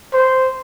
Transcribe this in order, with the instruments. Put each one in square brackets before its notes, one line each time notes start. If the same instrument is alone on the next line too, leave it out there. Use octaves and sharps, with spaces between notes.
[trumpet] C5